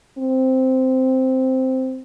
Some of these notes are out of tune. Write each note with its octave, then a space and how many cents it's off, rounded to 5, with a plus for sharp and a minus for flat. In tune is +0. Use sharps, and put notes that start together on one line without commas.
C4 -5